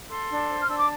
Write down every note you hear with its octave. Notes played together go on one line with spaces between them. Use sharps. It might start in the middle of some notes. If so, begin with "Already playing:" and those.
A4 C6
D4
C5
F6
D4 E6
D6